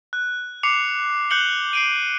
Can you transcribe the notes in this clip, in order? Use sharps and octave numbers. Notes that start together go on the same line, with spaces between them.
F#6
D6 C7 C#7 F7
F#6 G6 C#7 F#7 G7
C7 D7 D#7